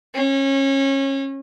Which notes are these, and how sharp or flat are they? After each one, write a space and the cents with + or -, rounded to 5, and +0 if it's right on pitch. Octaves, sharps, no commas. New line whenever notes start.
C#4 -25